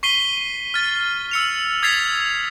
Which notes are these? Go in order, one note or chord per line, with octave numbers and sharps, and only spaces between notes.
C#6 B6 C7 D#7 G7
F6 A6
E6 C#7 F7
D#6 G#6 A6 B6 C7 F7